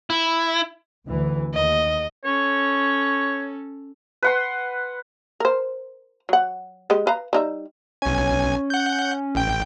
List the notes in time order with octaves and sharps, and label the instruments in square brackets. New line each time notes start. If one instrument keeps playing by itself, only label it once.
[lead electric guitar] E4
[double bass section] D2 E3
[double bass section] D#2 [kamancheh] D#5
[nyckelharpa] C#4 A4 [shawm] C#5
[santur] B4 F#5 C6
[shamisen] A#4 C5
F#3 F#5
G#3 G4 D#5
B4 F5 A#5
G3 D#4 E5
[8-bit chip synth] B1 G#5 [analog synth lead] C#4
[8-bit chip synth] F#5 G6
A1 G5